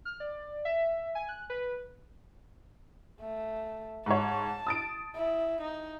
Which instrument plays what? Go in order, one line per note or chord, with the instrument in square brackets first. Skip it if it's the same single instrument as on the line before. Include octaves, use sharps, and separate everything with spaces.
[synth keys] F6
D5
E5
G#5
F#6
B4
[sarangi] A3
[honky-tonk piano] G#2 C#5 [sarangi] A5
[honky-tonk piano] D#6 A6 D7
[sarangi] E4
D#4